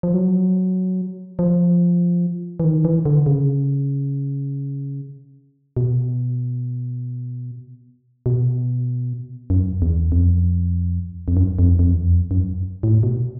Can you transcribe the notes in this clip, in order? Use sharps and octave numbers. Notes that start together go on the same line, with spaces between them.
F3
F#3
F3
E3
D#3
E3
D3
C#3
B2
B2
F#2
E2
F2
F2
F#2
F2
F2
E2
F2
F#2
A2
B2